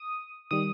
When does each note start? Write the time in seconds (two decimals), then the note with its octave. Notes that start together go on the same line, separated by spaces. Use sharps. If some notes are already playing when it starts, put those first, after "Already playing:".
Already playing: D#6
0.51 D#3 G3 D#6